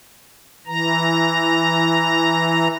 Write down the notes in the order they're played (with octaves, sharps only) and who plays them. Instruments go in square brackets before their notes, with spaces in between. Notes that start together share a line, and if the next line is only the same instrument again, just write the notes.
[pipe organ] E3 A#5